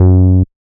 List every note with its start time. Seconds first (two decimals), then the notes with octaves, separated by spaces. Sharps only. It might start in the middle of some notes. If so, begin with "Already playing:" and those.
Already playing: F#2